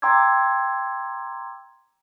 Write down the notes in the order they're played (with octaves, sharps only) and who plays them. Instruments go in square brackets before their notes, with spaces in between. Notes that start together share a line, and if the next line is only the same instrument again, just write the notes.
[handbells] G5 A#5 C6 D6 E6 G#6